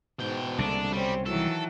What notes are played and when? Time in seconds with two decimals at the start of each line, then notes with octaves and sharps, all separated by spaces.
0.19 G#2 B2 G5
0.59 C2 B2 D3 G#3 A#3 D4
0.93 G3 C4 C#4
1.26 D#3 E3 F#3 A4